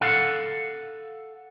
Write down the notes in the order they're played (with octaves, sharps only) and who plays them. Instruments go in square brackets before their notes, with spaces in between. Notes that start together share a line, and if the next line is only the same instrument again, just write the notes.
[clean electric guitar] A4 F5 F#5